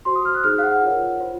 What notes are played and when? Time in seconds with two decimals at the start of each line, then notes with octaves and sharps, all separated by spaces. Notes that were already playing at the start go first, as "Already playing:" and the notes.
0.05 F#4 C5 C6
0.16 D#6
0.25 F6
0.34 F#6
0.44 D#4 G#4 C5 F6
0.58 F5
0.63 F#5
0.82 F4 A#4 C#5
1.20 F4 C5